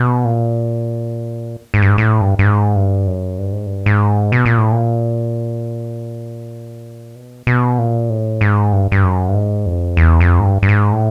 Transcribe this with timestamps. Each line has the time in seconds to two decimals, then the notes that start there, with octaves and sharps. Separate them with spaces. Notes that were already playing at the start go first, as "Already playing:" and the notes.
Already playing: B2
0.25 A#2
1.74 G#2
1.82 G2
1.90 G#2
1.98 A2
2.21 G2
2.39 G2
2.44 G#2
2.76 G2
3.07 F#2
3.39 G2
3.52 G#2
3.66 G2
3.86 G#2
4.32 B2
4.46 A#2
4.58 A2
4.72 A#2
7.16 B2
7.47 B2
7.79 A#2
8.10 A2
8.41 G#2
8.73 G2
8.92 G2
9.04 F#2
9.29 G2
9.34 G#2
9.66 F2
9.97 E2
10.20 F2
10.40 G#2
10.44 G2
10.63 G2
10.69 G#2
10.92 A2